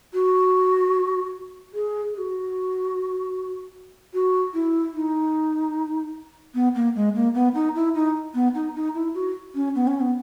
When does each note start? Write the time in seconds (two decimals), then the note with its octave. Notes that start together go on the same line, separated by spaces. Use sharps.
0.14 F#4
1.74 G#4
2.14 G#4
2.18 F#4
4.14 F#4
4.54 E4
4.94 D#4
6.54 B3
6.75 A#3
6.95 G#3
7.15 A#3
7.34 B3
7.54 D#4
7.75 E4
7.95 D#4
8.34 B3
8.54 D#4
8.75 D#4
8.94 E4
9.14 F#4
9.55 C#4
9.75 B3
9.87 C#4
10.00 B3